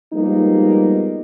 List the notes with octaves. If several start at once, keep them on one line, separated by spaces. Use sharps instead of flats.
F3 G3 G#3 A#3 B3 D#4